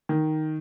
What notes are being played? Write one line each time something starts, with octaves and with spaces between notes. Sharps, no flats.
D#3